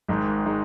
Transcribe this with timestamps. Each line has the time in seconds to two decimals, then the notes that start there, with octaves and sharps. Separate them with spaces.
0.08 G#1 G#2 D#3 G#3 D#4
0.45 D#3 G#3 D#4